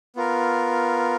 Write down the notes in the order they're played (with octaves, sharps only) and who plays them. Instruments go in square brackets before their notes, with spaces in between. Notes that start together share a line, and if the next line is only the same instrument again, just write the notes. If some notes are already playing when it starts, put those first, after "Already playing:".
[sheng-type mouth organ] B3 F4 A#4